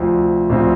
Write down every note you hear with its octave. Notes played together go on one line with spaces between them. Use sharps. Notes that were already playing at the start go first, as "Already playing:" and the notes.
Already playing: D2 C3 F3 C4
D2 C3 F3 C4